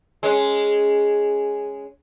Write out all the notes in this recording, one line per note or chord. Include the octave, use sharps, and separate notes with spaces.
G#3 C#4